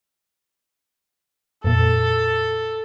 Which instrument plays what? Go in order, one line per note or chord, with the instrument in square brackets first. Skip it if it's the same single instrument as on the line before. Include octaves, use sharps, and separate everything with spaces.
[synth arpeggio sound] F2 A#2 [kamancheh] A4